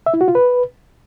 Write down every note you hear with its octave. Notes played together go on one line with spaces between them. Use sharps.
E5
E4
F#4
F4
B4